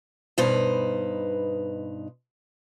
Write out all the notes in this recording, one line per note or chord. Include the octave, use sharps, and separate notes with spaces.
G2 B2 D#4 B4 C5